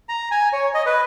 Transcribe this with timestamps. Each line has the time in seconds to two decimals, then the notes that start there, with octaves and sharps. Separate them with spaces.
0.09 A#5
0.31 G#5
0.53 C#5
0.74 D#5
0.86 B4